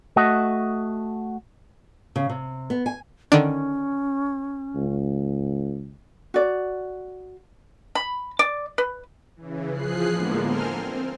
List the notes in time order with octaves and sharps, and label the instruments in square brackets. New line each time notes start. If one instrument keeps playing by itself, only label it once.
[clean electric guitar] A3 F#4 D#5
[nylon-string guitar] C#3
C3
B3
G#5
[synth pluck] D3 D#3 D4 [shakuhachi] C#4
[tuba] C#2
[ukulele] F#4 D5
[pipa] B5
D5
B4
[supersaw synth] C#3 E3
F3 G#4 F#6 C7
A2 D3 F3 G#3 A#3 B3
A4 A#4 C5 G#5 C6 F6
C4